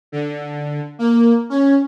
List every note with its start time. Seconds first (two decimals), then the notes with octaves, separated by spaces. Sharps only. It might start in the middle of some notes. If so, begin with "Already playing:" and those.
0.12 D3
0.99 A#3
1.50 C#4